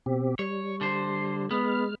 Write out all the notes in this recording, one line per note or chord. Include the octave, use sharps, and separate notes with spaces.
B2 C4 G4
G3 C#5
D3 C5
G#3 B3 F6